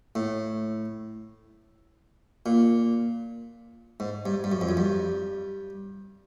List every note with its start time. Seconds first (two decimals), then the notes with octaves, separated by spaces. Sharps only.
0.15 A2
2.46 A#2
4.00 G#2
4.26 G2
4.44 G2
4.52 F#2
4.61 F2
4.69 F#2
4.77 G2